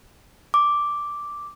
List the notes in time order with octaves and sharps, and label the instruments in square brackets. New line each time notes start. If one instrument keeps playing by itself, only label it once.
[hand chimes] D6